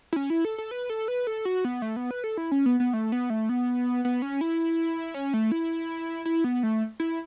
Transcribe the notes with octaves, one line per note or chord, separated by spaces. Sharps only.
E4
C#4
E4
A4
A4
B4
A4
B4
A4
F#4
B3
A3
B3
B4
A4
E4
C#4
B3
B3
A3
B3
A3
B3
B3
C#4
E4
C#4
A3
E4
E4
B3
A3
E4